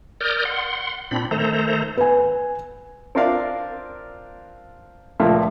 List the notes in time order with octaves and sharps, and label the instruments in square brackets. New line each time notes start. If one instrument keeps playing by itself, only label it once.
[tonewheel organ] A#4 D5 D#6 F6 G6
F#5 C6
A#2 C4 D4 B5
D#3 A3 A4 C5 A#5
[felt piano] B4 G#5
[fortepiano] C4 D4 F4 A#4 D5 F5
C#2 A#2 F3 A3 A#3